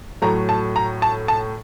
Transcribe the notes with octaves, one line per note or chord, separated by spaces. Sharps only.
A2 F#3 A3 A#5
A5
A#5
A5
A5